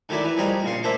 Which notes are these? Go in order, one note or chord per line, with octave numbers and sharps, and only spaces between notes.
D3 D#3 F#3 E4 D5
E3
F2 G3 G#4 A#4 D#5
A#1 C#3 C6
A#3 D4 C5 E5